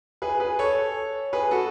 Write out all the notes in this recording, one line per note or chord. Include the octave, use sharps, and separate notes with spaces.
G#4 B4
G#4 B4
A4 C#5
G#4 B4
F#4 A4